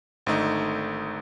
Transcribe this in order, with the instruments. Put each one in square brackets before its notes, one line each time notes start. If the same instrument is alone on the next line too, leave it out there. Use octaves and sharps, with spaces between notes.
[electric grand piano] G#1 D3 A3 D#4